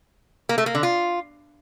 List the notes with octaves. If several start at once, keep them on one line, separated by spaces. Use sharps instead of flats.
A#3
A3
A#3
D3
F4